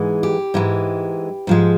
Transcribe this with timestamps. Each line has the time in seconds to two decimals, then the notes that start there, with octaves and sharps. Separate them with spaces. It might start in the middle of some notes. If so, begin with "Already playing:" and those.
Already playing: G#2 E3 G#3
0.23 G4
0.54 G#2 E3 G#3
1.47 G#2 F3 G#3